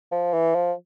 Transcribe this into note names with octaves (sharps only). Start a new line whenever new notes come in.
F3
E3
F3